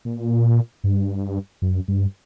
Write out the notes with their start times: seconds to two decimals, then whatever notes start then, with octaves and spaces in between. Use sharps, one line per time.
0.05 A#2
0.84 G2
1.62 F#2
1.88 G2